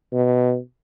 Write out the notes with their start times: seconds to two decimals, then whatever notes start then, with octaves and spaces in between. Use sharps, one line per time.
0.13 B2